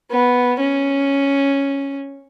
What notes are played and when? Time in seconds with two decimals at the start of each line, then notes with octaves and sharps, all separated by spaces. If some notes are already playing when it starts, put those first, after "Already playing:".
0.10 B3
0.60 C#4